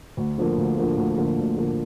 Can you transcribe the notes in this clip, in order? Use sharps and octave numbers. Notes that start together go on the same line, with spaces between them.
D2
D3 F3 A#3
D2
D3 F3 A#3
D2
D3 F3 A#3
D2
D3 F3 A#3